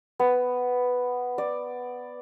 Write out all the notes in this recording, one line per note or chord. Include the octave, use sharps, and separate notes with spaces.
B3
D5